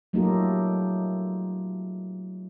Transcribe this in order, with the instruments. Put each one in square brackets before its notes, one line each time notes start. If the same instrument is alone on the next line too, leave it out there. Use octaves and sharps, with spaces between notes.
[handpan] F#3 A3 A#3 D#4 F4 G4